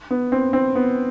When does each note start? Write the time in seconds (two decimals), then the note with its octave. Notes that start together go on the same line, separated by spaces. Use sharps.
0.11 B3
0.32 C4
0.53 C4
0.75 B3